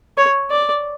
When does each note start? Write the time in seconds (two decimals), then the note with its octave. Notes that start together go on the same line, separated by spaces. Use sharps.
0.17 C#5
0.51 D5